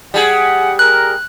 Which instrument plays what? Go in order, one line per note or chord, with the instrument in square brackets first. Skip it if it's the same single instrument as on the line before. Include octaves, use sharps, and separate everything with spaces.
[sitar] G3 G#4 [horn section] F#5
[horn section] A#4 [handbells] F#6